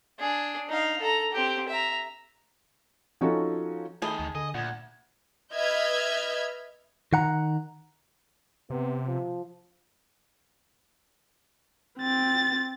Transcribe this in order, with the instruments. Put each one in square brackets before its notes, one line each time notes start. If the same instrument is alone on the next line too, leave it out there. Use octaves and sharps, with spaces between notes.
[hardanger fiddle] D4 G#4
D#4 F5
A4 A#5
C4 G4
E5 A#5
[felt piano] F3 C#4 D#4 F#4 A4
[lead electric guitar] D#3 [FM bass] A3 [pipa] G#4 [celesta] A5 B5 G7
[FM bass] D2
[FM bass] D3 [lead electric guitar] D#5 [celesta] G#5
[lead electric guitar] D2 [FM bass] A#2 [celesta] F#5 G#6
[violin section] B4 D#5 E5 F6 G6 G#6
[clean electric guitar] D#3 F#5 A#5
[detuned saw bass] C3 [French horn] B3
[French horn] F3
[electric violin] C4 A6